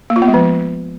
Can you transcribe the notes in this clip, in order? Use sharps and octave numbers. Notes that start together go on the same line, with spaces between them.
A#3
F4
B3
G#3
F3